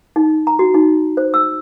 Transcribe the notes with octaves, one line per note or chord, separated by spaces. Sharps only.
D#4
A#5
F#4
D#4
C5
E6